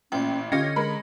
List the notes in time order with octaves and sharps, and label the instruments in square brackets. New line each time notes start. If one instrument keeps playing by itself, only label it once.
[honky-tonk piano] A1 A#2 [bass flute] C#4 [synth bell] G5
[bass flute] D3 [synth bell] C#4 D#5 [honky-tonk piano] F4 G4 A#6
[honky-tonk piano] G#3 A#4 B5